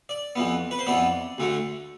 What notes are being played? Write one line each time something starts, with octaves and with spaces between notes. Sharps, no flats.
D5
F2 E3 B3
B4
C5
F2 E3 B3 D5
D2 D3 A3